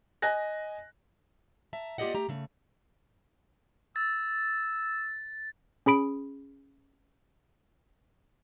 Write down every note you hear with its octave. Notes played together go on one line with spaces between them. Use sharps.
D#5 G#5 F#6 A#6
E5 A5 A#5
A#3 F4 G4 D5 D#5 F#5
A3 G4 A#5
C#3 A3
E6 A6
C#4 G#4 B5 D7